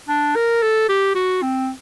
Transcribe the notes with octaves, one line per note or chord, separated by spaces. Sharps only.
D4
A#4
A4
G4
F#4
C4